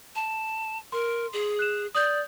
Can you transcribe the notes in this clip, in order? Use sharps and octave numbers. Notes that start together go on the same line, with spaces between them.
A5
A#4 C6
G#4
F#6 E7
D5 D#6 G6